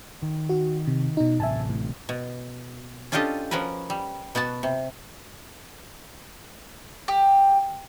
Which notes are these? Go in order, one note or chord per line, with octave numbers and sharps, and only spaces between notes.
D#3
F#4
C3
B2 D#4
A1 C3 E5 G#5 A5
A2
B2
C#4 D4 F4 G4 A4 D#5
F3 C#4 F#4 A#4 B4
G3
B2 B3 F#4 A5
C3
G4